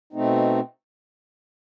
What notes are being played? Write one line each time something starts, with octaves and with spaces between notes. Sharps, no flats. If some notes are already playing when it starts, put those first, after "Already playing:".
B2 A3 C4 D#4